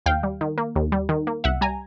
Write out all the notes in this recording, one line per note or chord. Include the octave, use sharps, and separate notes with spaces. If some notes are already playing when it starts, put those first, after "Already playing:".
D#2 F5 G5
G3
D#3
A#3
D#2
G3
D#3
A#3
C2 E5 F#5
G3 G#5 A#5